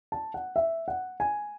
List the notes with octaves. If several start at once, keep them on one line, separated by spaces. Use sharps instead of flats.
A5
F#5
E5
F#5
G#5